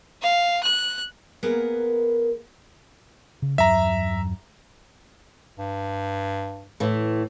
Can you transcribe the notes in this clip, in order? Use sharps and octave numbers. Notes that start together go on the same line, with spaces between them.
F5
F#6
A#3 B3 G#4 A#4 B4 F#5
C#3
E2 G2 F#3 E5 A#5
G2
A2 E3